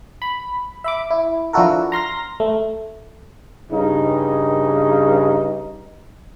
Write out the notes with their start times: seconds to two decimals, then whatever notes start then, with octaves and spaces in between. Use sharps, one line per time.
0.22 B5
0.84 E5 B5 D6
1.11 E4
1.53 F3 D4 E4 F#4 A4 A#4
1.92 A#5 C6 F6 A#6
2.40 A3
3.71 G2 C#3 D#4